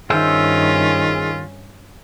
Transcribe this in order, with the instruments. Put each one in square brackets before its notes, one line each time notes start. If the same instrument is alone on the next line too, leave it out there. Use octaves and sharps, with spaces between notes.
[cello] G2 C#4 [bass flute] D#3 [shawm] F4 [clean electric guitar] G#4 C5 E5